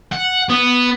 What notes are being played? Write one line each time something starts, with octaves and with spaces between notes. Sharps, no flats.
F#5
B3